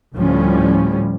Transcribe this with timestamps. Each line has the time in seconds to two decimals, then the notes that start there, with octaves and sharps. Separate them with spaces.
0.14 D2 A2 F3 G3 C#4